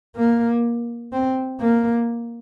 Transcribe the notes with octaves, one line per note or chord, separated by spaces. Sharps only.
A#3
C4
A#3